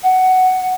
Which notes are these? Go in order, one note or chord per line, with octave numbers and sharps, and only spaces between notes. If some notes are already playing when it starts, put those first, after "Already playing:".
F#5